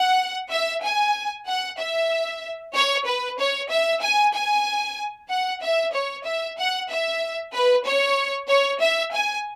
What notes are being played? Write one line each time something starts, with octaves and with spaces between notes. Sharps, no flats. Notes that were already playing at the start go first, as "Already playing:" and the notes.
Already playing: F#5
E5
G#5
F#5
E5
C#5
B4
C#5
E5
G#5
G#5
F#5
E5
C#5
E5
F#5
E5
B4
C#5
C#5
E5
G#5